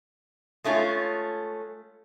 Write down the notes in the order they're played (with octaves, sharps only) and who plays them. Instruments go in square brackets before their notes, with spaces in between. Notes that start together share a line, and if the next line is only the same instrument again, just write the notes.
[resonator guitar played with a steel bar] G#3 A3 C#4 F4